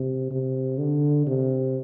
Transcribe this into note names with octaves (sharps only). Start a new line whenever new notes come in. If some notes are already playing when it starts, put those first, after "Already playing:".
Already playing: C3
C3
D3
C3